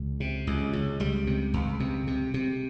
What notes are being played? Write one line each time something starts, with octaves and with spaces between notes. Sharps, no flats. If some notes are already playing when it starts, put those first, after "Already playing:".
Already playing: C#2
C3
C#2
C#2
C#2 G3
C3
C#2
C3
C3
C3